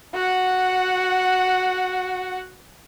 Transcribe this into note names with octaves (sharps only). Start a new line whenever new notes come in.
F#4 F#5